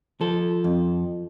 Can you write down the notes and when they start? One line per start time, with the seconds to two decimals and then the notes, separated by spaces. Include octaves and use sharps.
0.21 F3 A4
0.64 F2